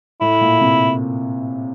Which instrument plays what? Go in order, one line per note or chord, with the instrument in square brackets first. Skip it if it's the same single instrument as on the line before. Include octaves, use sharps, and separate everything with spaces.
[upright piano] A2 [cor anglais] E4
[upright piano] A#2
C3